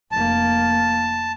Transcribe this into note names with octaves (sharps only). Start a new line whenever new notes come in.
F1 A#3 A5